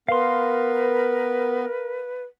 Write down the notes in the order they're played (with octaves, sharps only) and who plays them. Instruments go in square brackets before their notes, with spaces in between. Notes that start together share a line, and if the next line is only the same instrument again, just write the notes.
[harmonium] B3 [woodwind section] A#4 [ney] B4 [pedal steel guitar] F5 C6